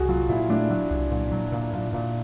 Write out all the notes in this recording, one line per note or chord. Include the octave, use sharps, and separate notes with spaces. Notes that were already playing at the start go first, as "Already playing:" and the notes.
Already playing: C2 F#4 G#4
F#3 F4
A#2 E4
A3 D4
F#3
C2
A#2
F#3
A#2
A#2
A#2